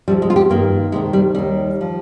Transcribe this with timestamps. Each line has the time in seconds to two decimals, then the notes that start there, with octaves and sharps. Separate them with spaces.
0.08 D2 C3 F3 G3
0.22 G#3
0.30 F4
0.36 G4
0.50 G2 D#3 A#3
0.92 D2 C3 D#3 G#3
1.13 G3
1.35 D#2 D#3 G3
1.81 F3